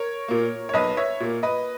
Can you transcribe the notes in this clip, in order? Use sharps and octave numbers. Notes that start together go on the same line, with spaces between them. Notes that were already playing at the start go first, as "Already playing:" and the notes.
Already playing: A#4 C#5
A#2 A#3
C#5
B1 B4 D#5
C#5 E5
A#2 A#3
B4 D#5